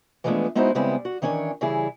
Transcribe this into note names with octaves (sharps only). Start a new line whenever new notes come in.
E3 F3 G#3 A3 B3 D4
G#3 B3 D#4 E4 F#4 C5
C#3 G3 G#3 B3 C4 E4
F#4
D#3 E3 C#4 D4 C#5
C#3 E3 G3 E4 G#4